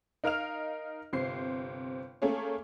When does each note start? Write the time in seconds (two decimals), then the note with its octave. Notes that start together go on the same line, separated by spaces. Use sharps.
0.24 D#4 A#4 F5 F6 F7
1.13 G1 C3 C5 C7
2.22 A3 A#3 C#4 G#4 C#5